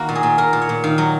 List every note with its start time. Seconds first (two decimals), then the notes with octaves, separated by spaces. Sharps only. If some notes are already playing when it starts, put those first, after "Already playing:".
Already playing: D#3 A#3 F#4
0.09 A#2
0.15 G#4
0.23 A#2
0.38 A#2 A#4
0.53 A#2
0.62 C#5
0.69 A#2
0.84 D#3 F5
0.98 F#3